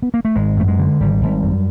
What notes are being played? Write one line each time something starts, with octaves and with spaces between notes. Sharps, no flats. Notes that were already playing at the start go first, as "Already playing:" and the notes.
B3
A#3
A3
G#1 G#3
F#2 A3
G#3
D3
G#1 G3
G#1
F#2